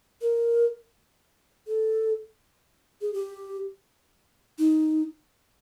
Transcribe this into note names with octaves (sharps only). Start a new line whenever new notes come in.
A#4
A4
G#4
G4
D#4